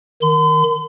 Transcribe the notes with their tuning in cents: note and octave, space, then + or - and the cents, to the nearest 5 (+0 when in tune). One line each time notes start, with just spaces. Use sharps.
D#3 +0 C6 -45